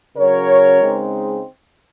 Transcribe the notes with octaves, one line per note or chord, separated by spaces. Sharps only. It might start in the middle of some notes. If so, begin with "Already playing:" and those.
C#3 F#3 C#4 A#4 C#5
C#3 G#3 C4 D#4